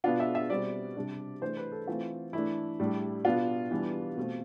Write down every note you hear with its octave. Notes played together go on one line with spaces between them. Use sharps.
B2 B3 D4 F4
E5
E5
B2 G3 C4 D5
C3 G3 D4
E3 A3 D4 C5
B4
A4
E3 A3 C4 F4
E3 A3 D4 E4
A2 G3 D4
B2 B3 D4 F4
E3 G3 B3 D4
B2 A3 C4